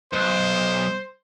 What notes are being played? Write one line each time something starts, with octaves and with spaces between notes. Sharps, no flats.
B1 C5